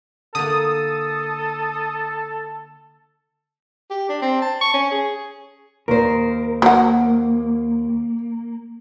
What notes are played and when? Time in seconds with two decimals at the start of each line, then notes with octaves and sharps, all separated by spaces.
0.35 D3 A#3 A4 D#6
3.90 G4
4.09 D4
4.22 C4
4.42 A5
4.61 C#6
4.74 C#4
4.91 G#4
5.88 D#2 A#4 C5
6.62 F#3 A#3 F#5